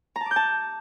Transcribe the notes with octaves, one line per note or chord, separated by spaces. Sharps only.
A#5
A5
D6
G6
A5